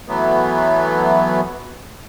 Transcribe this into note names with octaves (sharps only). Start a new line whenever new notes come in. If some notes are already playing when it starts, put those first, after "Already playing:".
E3 F#3 A3 B3